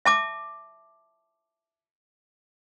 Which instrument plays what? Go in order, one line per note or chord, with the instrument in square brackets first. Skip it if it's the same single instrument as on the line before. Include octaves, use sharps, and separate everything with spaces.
[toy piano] E5 A5 D6